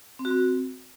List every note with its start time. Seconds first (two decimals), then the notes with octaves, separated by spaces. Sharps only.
0.19 C4
0.25 F#4
0.31 C4